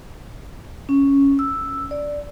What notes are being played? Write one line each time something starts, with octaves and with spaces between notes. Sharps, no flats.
C#4
E6
D5